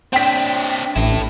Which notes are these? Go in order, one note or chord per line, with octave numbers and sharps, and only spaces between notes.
C4 D4 G5 B6
A1 E4 A4